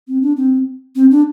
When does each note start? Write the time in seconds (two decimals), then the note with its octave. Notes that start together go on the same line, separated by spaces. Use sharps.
0.08 C4
0.22 D4
0.37 C4
0.96 C4
1.11 D4